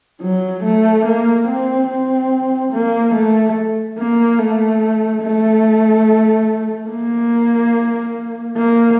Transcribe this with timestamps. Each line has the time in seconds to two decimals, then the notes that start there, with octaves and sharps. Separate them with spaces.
0.22 F#3
0.64 A3
1.06 A#3
1.48 C4
1.89 C4
2.73 A#3
3.15 A3
3.98 A#3
4.39 A3
5.23 A3
6.90 A#3
8.57 A#3